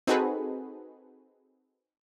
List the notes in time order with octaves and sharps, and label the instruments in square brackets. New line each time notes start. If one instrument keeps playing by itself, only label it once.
[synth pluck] C4 D#4 F#4 G#4 A4 B4